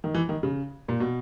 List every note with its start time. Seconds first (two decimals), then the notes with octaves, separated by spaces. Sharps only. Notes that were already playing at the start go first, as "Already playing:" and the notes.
0.04 D#3
0.14 E3
0.29 D#3
0.43 C#3
0.88 A#2
1.00 B2